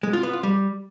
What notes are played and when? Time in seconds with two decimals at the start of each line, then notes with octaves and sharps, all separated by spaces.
0.03 G#3
0.13 F4
0.23 B3
0.33 F4
0.43 G3